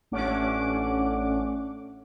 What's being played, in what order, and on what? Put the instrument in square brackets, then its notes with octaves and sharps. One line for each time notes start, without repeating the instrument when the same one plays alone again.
[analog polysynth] A1 A3 C#4 D4 F#5 D6